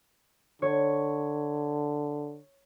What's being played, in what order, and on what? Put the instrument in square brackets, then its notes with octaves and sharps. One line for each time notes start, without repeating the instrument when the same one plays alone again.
[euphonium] D3 [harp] C#5